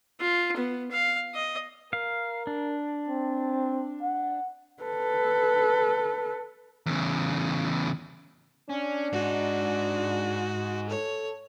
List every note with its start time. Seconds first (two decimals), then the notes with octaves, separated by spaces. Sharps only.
0.20 F4
0.57 B3
0.91 F5
1.35 D#5
1.93 A#4 F5
2.47 D4
3.09 C4
4.02 F#5
4.83 A4 B4
6.86 E2 C#3
8.69 C#4 D4
9.13 G#2 D#4 F#4
10.90 A4 C#5